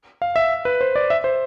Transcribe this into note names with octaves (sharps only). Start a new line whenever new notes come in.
F5
E5
B4
C5
D5
E5
C5